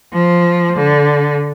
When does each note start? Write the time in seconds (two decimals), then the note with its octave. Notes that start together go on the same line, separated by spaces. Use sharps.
0.13 F3
0.76 D3